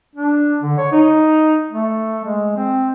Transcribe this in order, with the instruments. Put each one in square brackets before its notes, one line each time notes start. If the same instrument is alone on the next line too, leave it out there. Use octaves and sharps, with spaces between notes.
[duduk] D4
D3
C#5
D#4
A3
G#3
C4